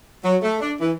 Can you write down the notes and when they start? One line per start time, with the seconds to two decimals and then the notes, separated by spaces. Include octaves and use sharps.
0.24 F#3
0.42 A3
0.61 D4
0.80 E3